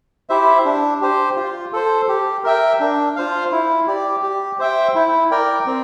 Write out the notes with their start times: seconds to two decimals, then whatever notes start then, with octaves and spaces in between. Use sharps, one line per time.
0.29 E4 G4 C5 E5
0.65 D4
1.01 G4 C5
1.37 F4
1.73 A4 C5
2.09 G4
2.44 A#4 E5 G5
2.80 D4
3.16 F4 C5 F5
3.52 E4
3.87 G4 D5
4.23 G4
4.59 C5 E5 G5
4.95 E4
5.31 A#4 D5 G5
5.66 C4